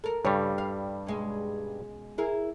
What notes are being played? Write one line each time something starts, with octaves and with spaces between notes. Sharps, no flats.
A4 A#4
G2 C#3 G3 C#5
F5
B2 G#3 C#4
E4 G#4 A#4